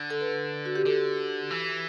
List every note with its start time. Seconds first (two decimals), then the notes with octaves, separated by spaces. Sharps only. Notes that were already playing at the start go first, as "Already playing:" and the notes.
Already playing: D3
0.10 A4
0.21 B4
0.66 F#4
0.76 G4
0.85 D3 A4
1.50 E3